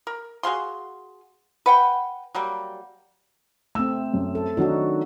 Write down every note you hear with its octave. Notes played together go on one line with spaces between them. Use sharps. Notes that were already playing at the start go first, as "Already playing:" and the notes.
A#4
F#4 G#4 F5 C6
B4 F#5 G5
F#3 G3 A#3
A3 C4 E6
F#2
A4
D#3 F#3 D4 D#4 F#4